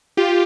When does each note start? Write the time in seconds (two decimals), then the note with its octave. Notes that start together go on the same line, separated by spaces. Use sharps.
0.17 F4 G4